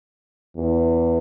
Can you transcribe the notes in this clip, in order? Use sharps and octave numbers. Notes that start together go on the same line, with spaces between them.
E2